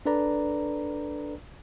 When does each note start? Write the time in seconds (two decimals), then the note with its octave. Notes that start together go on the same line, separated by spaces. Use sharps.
0.06 D4 A4 B4 D5 A#5